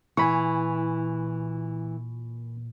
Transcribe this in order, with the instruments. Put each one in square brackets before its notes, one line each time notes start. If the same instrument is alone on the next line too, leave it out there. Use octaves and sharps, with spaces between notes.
[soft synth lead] A#2 [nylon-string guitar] E3 [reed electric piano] G#5 B5 C#6